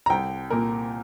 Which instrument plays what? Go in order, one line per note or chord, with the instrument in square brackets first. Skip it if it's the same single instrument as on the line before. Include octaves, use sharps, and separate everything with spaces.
[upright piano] A#5
C2 G5
A#2 A#3 A#4